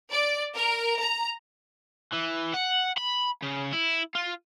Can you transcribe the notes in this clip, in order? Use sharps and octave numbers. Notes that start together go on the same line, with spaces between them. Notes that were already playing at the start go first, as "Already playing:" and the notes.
D5
A#4
A#5
E3
F#5
B5
C#3
E4
F4